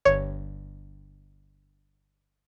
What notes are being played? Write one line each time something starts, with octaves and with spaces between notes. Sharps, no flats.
G1 C#5